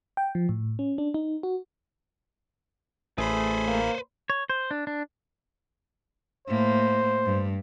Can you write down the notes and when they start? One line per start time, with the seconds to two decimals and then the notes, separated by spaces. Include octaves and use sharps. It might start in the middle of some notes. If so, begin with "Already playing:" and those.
0.17 G5
0.35 F3
0.49 A2
0.79 C#4
0.98 D4
1.14 D#4
1.43 F#4
3.18 A1 A3 G#4 B4 C5 B5
3.68 A#3
4.30 C#5
4.50 C5
4.71 D4
4.87 D4
6.48 A2 A#3 C5
7.25 G2